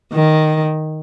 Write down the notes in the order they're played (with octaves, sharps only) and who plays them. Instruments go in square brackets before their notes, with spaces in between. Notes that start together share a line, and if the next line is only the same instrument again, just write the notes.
[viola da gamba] D#3